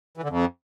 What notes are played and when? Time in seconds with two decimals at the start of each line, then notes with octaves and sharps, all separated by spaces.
0.17 E3
0.23 D3
0.29 F2